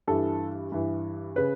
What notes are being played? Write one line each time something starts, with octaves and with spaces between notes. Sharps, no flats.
G2 E3 A4
G2 E3
C#3 B4